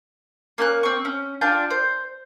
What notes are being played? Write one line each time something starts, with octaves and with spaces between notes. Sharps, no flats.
A#3 C#4 A#5 F#6
C4 C#6
C#4
D4 F4 G5 A5
C5